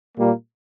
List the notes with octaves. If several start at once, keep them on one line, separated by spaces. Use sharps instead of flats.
A#2 G3 A#3